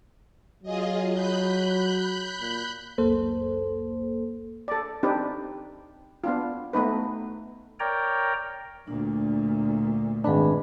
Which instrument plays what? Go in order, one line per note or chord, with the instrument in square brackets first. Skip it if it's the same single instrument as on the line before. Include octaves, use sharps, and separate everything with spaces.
[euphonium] F#3 [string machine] F4 G#4 D#5
[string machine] B5 F#6 G6
[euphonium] A#2
[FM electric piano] G1 C#2 F#2 A#3 A4 C5
[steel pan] A4 D5
C4 D4 D#4 G4 B4
B3 D4 F4
A3 B3 D#4 B4
[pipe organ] A#4 C#5 D5 G5 A#5
[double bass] D2 A#2 [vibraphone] D4
[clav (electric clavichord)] G#1 D4 [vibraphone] G#4 B4 B5